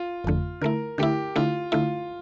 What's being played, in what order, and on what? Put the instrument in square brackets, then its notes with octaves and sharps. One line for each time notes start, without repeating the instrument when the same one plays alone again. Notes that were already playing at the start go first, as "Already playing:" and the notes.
Already playing: [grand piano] F4
[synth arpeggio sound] G1 F2 D3 A3
[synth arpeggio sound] D3 A3 E4 [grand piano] A#4
[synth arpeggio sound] D3 A3 E4 [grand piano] G4
[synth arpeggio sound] D3 A3 E4 [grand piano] F4
[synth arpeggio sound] D3 A3 E4 [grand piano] F4